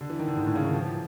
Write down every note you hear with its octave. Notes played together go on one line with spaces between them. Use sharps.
D3
E3
D#3
D3
G#2
A2
C#3
D#3
F3
E3